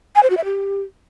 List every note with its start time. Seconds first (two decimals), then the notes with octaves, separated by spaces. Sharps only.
0.15 G#5
0.23 C5
0.30 F#4
0.37 E5
0.44 G4